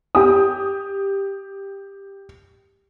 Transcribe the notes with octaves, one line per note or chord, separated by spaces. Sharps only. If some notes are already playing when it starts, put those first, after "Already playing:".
G4 D#6